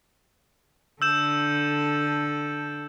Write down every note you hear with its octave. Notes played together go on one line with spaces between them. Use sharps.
D3 A4 E6 G6 E7